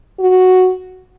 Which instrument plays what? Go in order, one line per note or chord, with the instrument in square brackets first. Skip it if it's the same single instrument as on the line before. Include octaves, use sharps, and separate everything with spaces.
[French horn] F#4